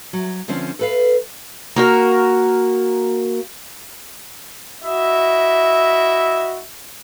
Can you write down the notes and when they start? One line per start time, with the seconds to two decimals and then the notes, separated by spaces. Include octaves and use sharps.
0.13 F#3
0.48 D3 F3 C4 C#4
0.79 A4 B4 F5
1.76 A#3 F#4 A#4
4.83 E4 F#4 D#5 E5